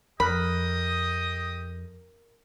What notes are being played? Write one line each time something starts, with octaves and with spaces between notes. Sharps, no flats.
F2 G4 A#4 D#5 B5 D#6 F#6